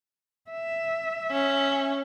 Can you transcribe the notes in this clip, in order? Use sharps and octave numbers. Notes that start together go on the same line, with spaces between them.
E5
C#4